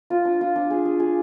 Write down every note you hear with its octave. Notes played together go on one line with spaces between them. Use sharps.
F4
D4
F4
D4
G#4
G#4
G#4